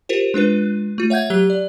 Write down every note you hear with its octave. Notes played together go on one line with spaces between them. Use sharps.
F4 G4 A#4 C5
G#3 D4 F4 B4
A3 F4
C#5 E5 F#5 G6 G#6
F#3 G4 F#6 G7
D5